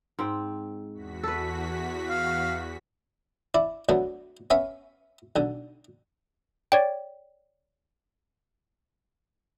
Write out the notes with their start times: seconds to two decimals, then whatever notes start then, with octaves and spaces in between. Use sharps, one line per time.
0.19 G#2 C4 G5
0.94 E2 F#4 B6
1.23 A4 B4
2.10 F5
3.54 E4 D5
3.89 D2 D3 F#3 B3
4.50 B3 C#4 E5 F5
5.36 B1 D3
6.72 C#5 D5 G5